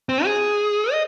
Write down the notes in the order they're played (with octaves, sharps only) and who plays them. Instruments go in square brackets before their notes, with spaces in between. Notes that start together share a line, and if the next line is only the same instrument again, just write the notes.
[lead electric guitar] C4
G#4
D#5